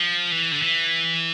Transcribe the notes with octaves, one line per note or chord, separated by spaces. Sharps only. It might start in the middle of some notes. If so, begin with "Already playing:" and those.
Already playing: F3
E3
D3
E3